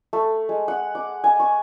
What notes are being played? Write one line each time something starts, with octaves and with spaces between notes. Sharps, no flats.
A3
G#3
F#5
D6
G#5
C#6